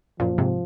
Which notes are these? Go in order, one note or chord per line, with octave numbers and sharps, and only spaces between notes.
F#2 A#2 F3
G#2 C3